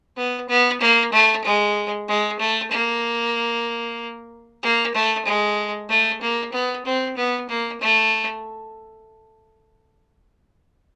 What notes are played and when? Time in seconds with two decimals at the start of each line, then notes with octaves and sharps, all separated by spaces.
0.17 B3
0.49 B3
0.81 A#3
1.13 A3
1.44 G#3
2.08 G#3
2.39 A3
2.71 A#3
4.63 A#3
4.94 A3
5.25 G#3
5.89 A3
6.21 A#3
6.53 B3
6.85 C4
7.17 B3
7.49 A#3
7.81 A3